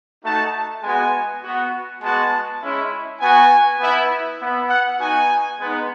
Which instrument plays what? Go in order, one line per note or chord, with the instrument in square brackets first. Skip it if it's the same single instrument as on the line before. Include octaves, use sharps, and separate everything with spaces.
[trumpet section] A3 D#4 F#4 A5
G#3 B3 F#4 G#5
B3 F#4
G#3 B3 F#4 A5
G#3 C#4 E4
B3 F#4 G#5
B3 E4
B3 E4
F#5
B3 D#4 F#4 G#5
G#3 B3 D#4